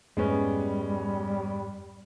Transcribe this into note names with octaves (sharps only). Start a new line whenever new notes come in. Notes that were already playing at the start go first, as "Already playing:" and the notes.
F2 G#2 G3 G#3 B3 C#4